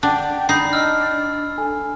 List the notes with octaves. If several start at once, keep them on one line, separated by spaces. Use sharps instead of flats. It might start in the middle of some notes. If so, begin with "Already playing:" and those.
D4 F#5 G5
D4 D#4 G5 B5 C7
D#5 E6 F6
D4 A4 G#5